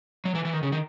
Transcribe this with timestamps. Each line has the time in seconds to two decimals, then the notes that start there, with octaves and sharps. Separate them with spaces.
0.25 F#3
0.35 E3
0.45 E3
0.53 D#3
0.63 C#3
0.72 D#3